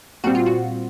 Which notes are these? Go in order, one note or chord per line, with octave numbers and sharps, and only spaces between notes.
A#2 G3 C4 F#4
F4
F#4